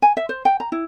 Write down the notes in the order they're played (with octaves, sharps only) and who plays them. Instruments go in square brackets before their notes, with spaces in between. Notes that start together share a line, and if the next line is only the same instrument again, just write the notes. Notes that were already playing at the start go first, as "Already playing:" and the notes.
[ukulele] G#5
E5
C5
G5
A#5
E4